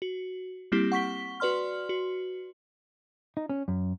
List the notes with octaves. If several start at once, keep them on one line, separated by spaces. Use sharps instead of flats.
F#4
G3 A#3 C4 E4 G4
F#5 C#6 B6 G7
F#4 B4 D5 C6 F6
F#4
D#4
C#4
F#2